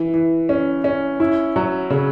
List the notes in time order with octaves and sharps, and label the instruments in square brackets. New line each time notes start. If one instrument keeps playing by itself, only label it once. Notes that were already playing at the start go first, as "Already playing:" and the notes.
Already playing: [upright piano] E3
E3
C#4
C#4
E4
F#3
C#3